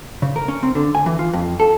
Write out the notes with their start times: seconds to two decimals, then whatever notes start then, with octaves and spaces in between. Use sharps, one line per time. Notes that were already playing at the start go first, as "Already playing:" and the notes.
0.22 C#3
0.36 A#4
0.48 C#4
0.63 C4
0.75 D3
0.95 G#5
1.06 E3
1.19 F4
1.33 F2
1.60 A4